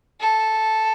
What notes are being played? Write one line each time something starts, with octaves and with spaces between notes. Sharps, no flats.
A4